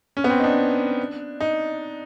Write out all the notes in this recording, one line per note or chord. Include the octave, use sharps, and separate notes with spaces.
C#4
B3
C4
D#4
D4
D#4